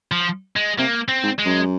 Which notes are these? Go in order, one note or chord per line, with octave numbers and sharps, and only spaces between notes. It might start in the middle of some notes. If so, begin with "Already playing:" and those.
F3
G#3
C3 A#3
C4
G#2
G#3
F#2